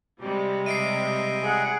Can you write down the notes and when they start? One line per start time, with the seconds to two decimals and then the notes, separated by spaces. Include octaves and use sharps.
0.22 C3 G3 G#3
0.66 D#5 E5 C7 D7 D#7
1.43 G#4 F#5